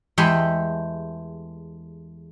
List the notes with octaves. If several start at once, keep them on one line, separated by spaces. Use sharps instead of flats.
E2 G#3 A3 E4 G4 C6